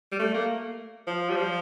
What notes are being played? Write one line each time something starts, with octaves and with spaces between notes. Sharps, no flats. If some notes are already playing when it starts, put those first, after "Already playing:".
G3
A3
A#3
F3
G3
F3